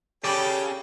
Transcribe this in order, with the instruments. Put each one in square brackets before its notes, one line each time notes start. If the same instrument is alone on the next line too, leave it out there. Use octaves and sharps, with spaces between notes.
[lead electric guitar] C#3 [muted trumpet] G4 [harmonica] A4 C#5 G5 [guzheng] D5 B5